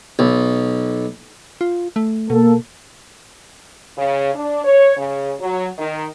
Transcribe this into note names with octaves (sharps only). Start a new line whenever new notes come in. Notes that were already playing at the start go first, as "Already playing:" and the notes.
B1
F4
A3
B2 A#3 A4
C#3
D4
C#5
C#3
F#3
D#3